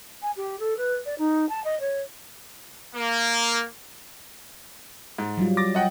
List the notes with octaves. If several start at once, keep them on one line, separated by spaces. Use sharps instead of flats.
G#5
G4
A4
B4
D5
D#4
A5
D#5
C#5
A#3
G#2
F#3 G3 F4
D6 A6 A#6
D#5 F#5 G5